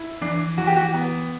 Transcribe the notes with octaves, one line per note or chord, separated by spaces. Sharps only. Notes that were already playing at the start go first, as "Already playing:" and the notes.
Already playing: E4
E3 D4
E3 F#4
G4
F#4
B3